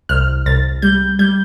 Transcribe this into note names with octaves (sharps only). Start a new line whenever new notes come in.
C2 F6
C2 A6
G3 G6
G3 G6